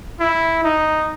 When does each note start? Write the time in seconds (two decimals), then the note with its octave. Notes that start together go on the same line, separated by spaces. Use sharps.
0.20 E4
0.64 D#4